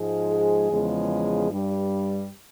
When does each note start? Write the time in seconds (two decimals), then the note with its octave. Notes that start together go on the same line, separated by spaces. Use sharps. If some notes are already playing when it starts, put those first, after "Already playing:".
Already playing: G#2 F3 G#3
0.31 G#4
0.70 E2 C#3 F3 G#3
1.50 G2 G3